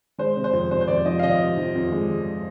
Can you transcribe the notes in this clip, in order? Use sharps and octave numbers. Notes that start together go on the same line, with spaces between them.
G#3 C5
C3
C5
F2
C3 C5
C5
F2 D5
F3 D#5
F5
C3 D#5
C3
F3
F2
G#3
G#3